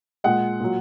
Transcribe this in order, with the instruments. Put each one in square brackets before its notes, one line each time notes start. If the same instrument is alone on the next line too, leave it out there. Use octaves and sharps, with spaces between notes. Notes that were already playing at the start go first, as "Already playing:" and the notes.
[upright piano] A#2 G#3 F#5
A#2 F#3